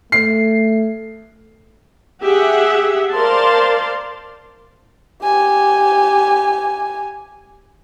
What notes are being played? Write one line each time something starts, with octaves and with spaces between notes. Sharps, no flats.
A3 C7
G4 G#4 E5 F#5
A#4 C5 D5 F5 A5 C6
G4 G#5